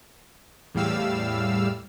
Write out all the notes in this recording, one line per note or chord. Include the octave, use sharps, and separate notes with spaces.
E2 A2 G3 F5 E6